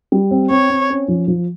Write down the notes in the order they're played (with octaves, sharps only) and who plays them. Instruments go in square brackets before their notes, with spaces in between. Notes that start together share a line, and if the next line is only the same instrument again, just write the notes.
[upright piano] G3
C4
[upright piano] C4 [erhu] C#5
[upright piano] C4
C#4
F3
F3